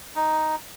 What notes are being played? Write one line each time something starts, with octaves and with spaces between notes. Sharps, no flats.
D#4